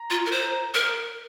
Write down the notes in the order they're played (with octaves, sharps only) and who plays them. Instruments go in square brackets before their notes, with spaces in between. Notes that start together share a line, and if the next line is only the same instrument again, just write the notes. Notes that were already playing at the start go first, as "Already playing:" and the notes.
Already playing: [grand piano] A#5
[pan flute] F4
A#4
C5
A#4